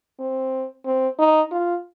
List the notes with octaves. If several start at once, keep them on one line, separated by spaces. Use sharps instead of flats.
C4
C4
D#4
F4